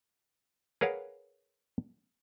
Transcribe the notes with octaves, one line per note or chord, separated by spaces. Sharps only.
G#4 A#4 B4 C#5 F5 F#5